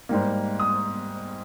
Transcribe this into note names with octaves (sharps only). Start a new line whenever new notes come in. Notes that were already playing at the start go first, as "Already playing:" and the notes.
G#2 G3 A#3
D#6